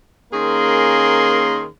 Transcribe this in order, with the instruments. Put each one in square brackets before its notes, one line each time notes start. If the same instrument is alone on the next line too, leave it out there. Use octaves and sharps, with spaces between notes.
[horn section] D#3 A#3 C#4 G#4 A#4 C6